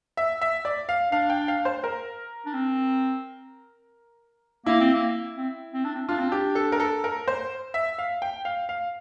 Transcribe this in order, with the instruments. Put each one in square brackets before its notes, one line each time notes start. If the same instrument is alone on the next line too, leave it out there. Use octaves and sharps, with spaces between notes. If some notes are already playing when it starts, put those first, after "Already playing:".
[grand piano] E5
E5
D5
F5
[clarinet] D4 [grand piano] F5
[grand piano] G5
F5
C5
A#4
[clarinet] D4
C4
[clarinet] A#3 [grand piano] E4
[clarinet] C4
A#3
C4
C4
D4
C4
[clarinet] D4 [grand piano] F4
[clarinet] C4
[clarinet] D4 [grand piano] G4
[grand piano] A4
A#4
A4
A#4
C5
E5
F5
G5
F5
F5